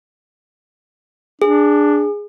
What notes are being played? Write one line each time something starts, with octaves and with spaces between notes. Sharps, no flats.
D4 G#4